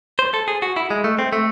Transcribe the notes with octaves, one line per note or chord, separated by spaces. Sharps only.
C5
A4
G#4
F#4
E4
G#3
A3
C4
A3